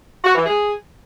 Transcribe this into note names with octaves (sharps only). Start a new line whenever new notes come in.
F#4
E3
G#4